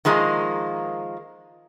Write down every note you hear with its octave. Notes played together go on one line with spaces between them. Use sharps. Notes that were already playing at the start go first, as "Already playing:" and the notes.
D#3 F3 G#3 A#3